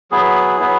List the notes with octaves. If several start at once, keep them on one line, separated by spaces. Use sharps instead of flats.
F#3 B3 E4 G#4
F#3 B3 E4